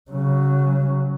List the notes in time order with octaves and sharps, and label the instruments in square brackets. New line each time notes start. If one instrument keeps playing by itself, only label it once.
[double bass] C#3 F#3